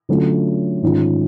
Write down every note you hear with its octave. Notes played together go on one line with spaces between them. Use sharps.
D3 F#3 A3 C#4 F4
G#2 D#3 G#3 C#4 F4